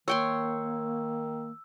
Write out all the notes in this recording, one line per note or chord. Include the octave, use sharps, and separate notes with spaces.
D#3 A#3 C#5 G5 C6 E6